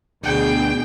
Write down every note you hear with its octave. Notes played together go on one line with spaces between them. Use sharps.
D2 B2 D4 G#4 G5